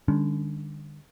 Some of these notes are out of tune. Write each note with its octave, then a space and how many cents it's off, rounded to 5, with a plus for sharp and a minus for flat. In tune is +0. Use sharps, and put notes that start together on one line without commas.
D3 +35 G3 +45 C#4 +45